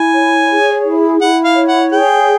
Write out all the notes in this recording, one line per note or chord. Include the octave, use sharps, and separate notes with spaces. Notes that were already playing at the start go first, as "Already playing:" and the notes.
Already playing: E4 G#5
C#5
G#4
E4
E4 F#5
F5
C#5
F#5
G#4 G5